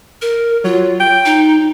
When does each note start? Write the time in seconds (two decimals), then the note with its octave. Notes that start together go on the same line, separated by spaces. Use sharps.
0.22 A#4
0.64 F#3 F4
1.00 G5
1.25 D#4